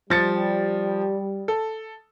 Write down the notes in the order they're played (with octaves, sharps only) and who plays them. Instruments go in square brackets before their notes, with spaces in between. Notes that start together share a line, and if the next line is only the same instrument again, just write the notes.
[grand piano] F3 A6 C#7 [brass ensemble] G3
[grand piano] A4